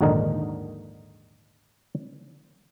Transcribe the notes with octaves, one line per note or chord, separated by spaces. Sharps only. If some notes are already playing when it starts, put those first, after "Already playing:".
A#1 D#2 G#2 D3 D#4 A#4